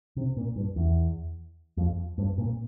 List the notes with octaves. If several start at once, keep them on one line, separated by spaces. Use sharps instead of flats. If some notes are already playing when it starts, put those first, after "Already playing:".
C3
A#2
G2
E2
F2
G2
A#2